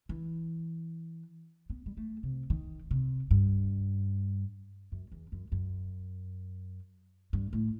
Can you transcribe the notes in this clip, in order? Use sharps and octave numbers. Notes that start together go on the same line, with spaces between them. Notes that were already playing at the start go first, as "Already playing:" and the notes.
E3
B3
G3
A3
C3
D#3
C3
G2
F#2
E2
F#2
F#2
G2
A2